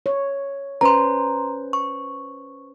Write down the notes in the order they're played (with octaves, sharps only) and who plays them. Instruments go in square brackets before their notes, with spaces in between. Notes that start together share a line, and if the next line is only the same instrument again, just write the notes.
[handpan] C#5
[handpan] C#4 B4 C5 [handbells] A#5 C6
[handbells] C#6